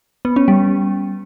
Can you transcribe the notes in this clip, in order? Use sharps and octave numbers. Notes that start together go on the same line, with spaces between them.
B3
C#4
G3